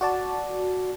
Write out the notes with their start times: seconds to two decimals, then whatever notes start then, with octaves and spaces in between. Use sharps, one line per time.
0.01 F#4 D5 A5